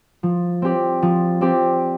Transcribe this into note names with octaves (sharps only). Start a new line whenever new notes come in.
F3
C4 G4 D5
F3
C4 G4 D5